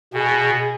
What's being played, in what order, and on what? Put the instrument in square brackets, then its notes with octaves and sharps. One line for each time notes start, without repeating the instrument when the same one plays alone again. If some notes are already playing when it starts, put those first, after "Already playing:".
[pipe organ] B2 [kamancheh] G#4